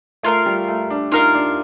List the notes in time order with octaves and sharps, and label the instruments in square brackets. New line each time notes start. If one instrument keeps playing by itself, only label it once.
[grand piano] A3 [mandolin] F4 A#4 F5
[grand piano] G3
A3
D4
[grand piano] D#4 [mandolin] F4 A#4 F5
[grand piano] D4